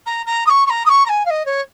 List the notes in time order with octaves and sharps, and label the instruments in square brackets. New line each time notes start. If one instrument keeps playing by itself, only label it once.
[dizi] A#5
A#5
D#6
C#6
C#6
A#5
D#6
C#6
A#5
G#5
F5
D#5
C#5